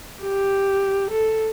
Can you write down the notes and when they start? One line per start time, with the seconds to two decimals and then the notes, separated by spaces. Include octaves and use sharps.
0.22 G4
1.11 A4